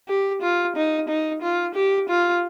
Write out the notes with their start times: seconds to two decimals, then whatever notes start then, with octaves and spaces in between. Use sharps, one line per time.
0.08 G4
0.42 F4
0.76 D#4
1.09 D#4
1.42 F4
1.75 G4
2.09 F4